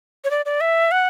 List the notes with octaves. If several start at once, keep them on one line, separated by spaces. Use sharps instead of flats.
C#5
D5
D5
E5
F#5